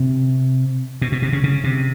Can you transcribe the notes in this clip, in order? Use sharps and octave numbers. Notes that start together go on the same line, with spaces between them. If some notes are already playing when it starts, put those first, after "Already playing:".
Already playing: C3
B2
B2
C3
C#3
C#3
C3